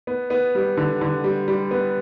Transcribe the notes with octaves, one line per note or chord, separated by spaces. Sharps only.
B3
B3
G3
D3
D3
G3
G3
B3